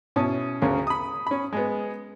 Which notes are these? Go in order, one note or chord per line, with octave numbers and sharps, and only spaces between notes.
B2 C#4 E4 A5 D#6
D2 C#3 C#4 G#4 A#4
B5 D#6
C#4 B5
G#3 B3